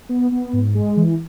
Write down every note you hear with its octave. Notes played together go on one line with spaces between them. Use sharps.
B3
B3
G#2
G#3
E3